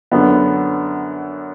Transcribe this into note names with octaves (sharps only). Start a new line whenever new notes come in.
F#2 D3 B3